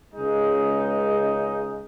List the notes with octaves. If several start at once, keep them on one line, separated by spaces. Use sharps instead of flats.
C#2 C#3 G#3 D#4